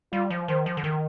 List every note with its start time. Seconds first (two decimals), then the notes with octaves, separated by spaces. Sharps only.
0.13 G3 F4
0.30 F3
0.48 D#3 C5
0.66 F3
0.77 D3
0.84 D#3